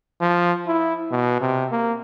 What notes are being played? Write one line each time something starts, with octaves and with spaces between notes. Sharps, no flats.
F3
E4
B2
C3
A#3